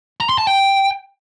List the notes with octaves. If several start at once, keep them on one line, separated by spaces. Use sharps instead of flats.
A#5
C6
A5
G5